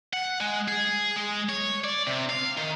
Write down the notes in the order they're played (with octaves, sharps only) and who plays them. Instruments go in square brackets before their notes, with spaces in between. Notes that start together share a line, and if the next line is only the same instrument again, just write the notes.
[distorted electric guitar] F#5
G#3
G#4
G#3
C#5
D5
C3
F5
D#3